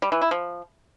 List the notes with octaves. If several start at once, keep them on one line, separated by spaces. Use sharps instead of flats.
G3
E3
E4
F3